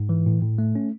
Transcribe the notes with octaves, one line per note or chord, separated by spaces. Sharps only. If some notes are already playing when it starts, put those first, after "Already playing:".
Already playing: G#2
E3
A2
A2
A3
C#4